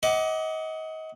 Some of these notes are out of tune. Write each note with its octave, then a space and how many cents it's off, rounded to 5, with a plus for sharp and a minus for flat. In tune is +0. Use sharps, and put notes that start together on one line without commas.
D#5 +30 F#5 +15 D6 +0